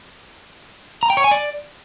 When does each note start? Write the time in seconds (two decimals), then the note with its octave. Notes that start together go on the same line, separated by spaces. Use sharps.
1.03 A#5
1.10 G5
1.17 C#5
1.24 G#5
1.31 D5